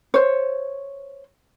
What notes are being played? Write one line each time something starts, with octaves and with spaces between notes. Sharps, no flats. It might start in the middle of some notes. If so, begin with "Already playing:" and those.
C5 C#5